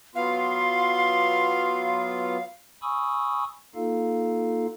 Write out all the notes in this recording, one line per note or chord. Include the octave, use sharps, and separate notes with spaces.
F#3 B3 F4 F5 C6
G#5 B5 C#6 D#6 E6
A#3 D#4 F4 A4 F5